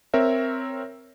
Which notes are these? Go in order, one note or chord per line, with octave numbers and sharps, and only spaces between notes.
C4 A#4 C#5 E5